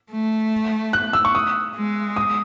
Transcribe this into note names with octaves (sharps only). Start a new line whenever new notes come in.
A3
F#6
E6
C#6
D#6
G#3
D#6